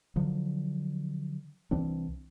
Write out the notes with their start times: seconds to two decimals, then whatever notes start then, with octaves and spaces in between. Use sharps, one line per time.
0.16 D3 F3 F#3
1.71 C2 E3 C4 D4